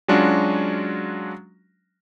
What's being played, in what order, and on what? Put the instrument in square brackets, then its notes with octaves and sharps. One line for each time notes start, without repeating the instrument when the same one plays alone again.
[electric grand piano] F#3 G#3 C#4 D4 F4 F#4